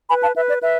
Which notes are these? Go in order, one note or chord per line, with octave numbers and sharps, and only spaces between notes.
B4 G#5 B5
F5 A5
B4 E5
D5
B4 E5